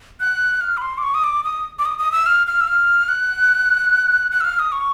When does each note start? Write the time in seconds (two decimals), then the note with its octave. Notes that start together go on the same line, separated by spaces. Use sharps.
0.20 F#6
0.61 F6
0.77 B5
0.82 C6
0.98 D6
1.03 C#6
1.14 D#6
1.24 D6
1.44 D#6
1.79 D6
1.85 D#6
1.99 D#6
2.12 E6
2.26 F6
2.47 F6
2.61 E6
2.67 F6
3.09 F#6
4.31 F#6
4.41 E6
4.45 F6
4.59 D#6
4.72 C#6